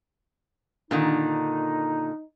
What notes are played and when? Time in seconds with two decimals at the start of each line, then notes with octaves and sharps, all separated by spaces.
0.91 A#2 D3 D#3 D#4